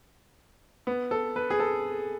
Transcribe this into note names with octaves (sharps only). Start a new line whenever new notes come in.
B3
A4
B4
G#4
A4